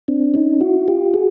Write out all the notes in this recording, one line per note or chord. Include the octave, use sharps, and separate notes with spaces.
C4 D4
C#4 D#4
E4 F#4
F4 G4
F#4 G#4